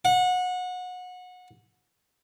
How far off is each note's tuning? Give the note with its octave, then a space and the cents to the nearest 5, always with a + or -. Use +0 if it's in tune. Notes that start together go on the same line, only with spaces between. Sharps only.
F#5 -25